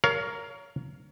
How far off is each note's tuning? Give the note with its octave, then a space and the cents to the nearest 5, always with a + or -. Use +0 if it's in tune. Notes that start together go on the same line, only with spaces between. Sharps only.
A#4 +0 C#5 +30 F5 +5